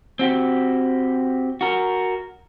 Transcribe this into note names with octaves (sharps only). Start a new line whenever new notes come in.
C4 F#4 G4
F#4 A#4